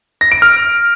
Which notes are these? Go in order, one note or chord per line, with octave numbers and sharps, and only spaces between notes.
A#6
D7
F6